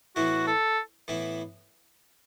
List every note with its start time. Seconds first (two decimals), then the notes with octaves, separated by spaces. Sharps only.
0.16 A2 E3 B3 E4 F#4
0.47 A4
1.08 A2 E3 B3 E4